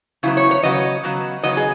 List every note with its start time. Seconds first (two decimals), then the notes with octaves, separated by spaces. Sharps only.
0.23 C#3 F#3 B3 E4
0.37 C#5
0.51 C#5
0.63 C#3 F#3 B3 D#5
1.03 C#3 F#3 B3
1.43 C#3 F#3 B3 D#5
1.57 G#4